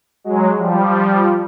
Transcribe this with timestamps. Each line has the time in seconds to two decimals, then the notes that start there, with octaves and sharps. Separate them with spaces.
0.24 F#3 G#3
0.57 F3 G3